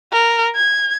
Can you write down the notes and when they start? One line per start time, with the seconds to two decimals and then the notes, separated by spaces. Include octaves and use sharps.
0.12 A#4
0.56 G#6